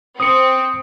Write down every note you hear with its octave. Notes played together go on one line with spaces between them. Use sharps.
C4 D#6 C#7